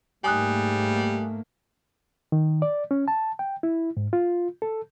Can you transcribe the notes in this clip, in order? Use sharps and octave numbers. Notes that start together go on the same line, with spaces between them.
G#2 G3 A3 A#3 G#5 D#6 F#6
D#3
D5
C#4
A5
G5
E4
G#2
F4
A4